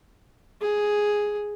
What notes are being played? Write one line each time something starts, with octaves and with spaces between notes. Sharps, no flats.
G#4